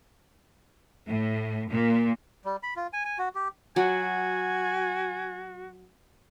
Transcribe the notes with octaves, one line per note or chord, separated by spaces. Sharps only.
A2
A#2
G3
B5
F4
G#5
G#5
F#4
G4
F#3 F#4 G#5